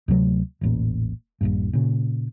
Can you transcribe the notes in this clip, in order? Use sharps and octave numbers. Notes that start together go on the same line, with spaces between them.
D2 C3 F#3 A3
E1 A1 A#2
D#1 A#1 G2
A#2 C#3